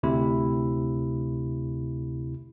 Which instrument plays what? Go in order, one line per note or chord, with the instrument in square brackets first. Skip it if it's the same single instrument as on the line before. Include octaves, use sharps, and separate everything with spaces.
[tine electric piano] D2 C3 E4